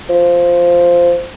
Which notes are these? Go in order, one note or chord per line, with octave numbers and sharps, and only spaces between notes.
F3